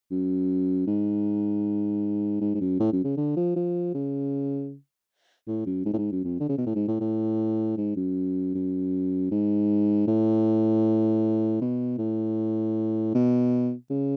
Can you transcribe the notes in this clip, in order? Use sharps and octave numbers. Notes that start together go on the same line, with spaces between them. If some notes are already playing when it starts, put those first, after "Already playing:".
F#2
G#2
G#2
G#2
F#2
A2
F#2
C#3
D3
F3
F3
C#3
A2
F#2
G#2
A2
G#2
F#2
F2
D3
C#3
B2
A2
G#2
A2
A2
G#2
F#2
F#2
G#2
A2
B2
A2
B2
C#3